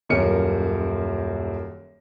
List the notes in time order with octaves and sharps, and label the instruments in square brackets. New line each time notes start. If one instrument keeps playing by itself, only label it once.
[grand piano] D#1 F#2 A#3 A#4 C#7